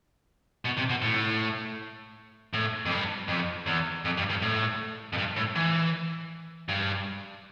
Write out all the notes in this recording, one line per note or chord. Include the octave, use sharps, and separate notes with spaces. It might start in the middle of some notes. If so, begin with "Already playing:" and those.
B2
C3
B2
A2
A2
F2
G2
F2
E2
F2
G2
G2
A2
F2
G2
A2
E3
G2